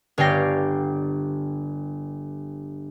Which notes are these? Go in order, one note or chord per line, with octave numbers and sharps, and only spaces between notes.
G1 C#5 D5 F5 G5 A#6